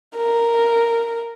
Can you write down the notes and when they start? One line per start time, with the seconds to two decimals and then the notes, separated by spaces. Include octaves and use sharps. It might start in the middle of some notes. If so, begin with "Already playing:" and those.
0.17 A#4